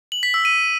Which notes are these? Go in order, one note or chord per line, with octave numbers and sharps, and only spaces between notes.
F#7
B6
E6
D#7